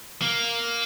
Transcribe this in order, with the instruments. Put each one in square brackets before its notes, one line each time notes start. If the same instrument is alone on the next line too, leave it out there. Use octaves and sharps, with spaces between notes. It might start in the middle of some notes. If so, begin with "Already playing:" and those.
[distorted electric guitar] A#3